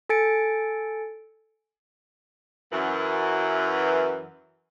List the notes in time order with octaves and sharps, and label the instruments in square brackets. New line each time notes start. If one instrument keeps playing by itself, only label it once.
[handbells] A4 G#5 A6 C#7 D7
[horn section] F#2 E3